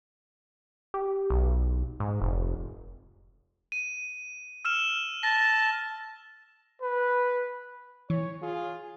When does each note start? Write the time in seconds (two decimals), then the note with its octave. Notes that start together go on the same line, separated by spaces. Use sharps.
0.94 G4
1.30 B1
2.00 G#2
2.22 F1
3.72 D#7
4.65 E6 F6 E7
5.23 A5 A#6
6.82 B4
8.10 E3 C#5
8.42 F4 G#4